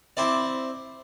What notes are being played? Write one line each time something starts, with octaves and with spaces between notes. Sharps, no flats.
C4 E4 D5